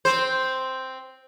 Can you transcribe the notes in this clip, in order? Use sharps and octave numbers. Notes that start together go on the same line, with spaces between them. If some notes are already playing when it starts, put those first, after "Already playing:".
C4 C5